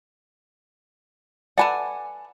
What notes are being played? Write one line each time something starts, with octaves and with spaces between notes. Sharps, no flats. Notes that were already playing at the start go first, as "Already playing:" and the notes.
A4 B4 D5 F#5 G#5